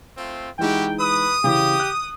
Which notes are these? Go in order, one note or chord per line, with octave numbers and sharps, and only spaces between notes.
A3 C4 F4
E3 G#3 D#4 E4 F#4 G4 G5
B4 D#6
C#3 E3 G4
F#6